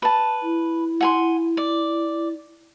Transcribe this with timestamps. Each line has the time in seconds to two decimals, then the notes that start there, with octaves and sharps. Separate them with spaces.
0.02 B4 A5
0.43 E4
1.00 F#5 G#5 C6
1.57 D5